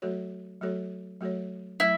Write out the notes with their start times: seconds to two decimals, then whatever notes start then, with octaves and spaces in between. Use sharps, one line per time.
0.02 F#3 A3 F#4 A4 C#5
0.61 F#3 A3 F#4 A4 C#5
1.21 F#3 A3 F#4 A4 C#5
1.80 F#3 A3 E4